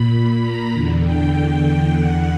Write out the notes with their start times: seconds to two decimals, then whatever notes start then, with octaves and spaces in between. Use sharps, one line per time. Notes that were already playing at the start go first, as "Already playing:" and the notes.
Already playing: A#2 B5
0.13 B5
0.42 A#5
0.73 E2 D3
1.02 G5
1.91 E2 D3 F#5